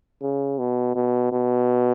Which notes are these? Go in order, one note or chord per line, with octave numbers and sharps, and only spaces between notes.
C#3
B2
B2
B2